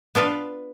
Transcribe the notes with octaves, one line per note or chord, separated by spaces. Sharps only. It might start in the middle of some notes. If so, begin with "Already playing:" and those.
B3 D4 F4 B4